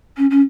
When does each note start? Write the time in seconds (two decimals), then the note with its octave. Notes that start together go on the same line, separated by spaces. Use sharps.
0.17 C#4
0.30 C#4